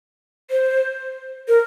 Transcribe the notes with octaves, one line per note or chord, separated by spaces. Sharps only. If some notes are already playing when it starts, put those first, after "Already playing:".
C5
A#4